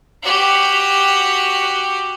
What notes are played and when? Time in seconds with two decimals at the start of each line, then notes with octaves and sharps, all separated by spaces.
0.23 F#4 G4